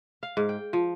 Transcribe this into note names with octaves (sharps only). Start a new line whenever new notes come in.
F5
G#2
G5
F3